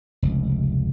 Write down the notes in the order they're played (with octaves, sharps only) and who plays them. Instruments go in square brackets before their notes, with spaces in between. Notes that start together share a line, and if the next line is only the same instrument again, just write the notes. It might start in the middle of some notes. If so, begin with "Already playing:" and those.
[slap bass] F1 C#2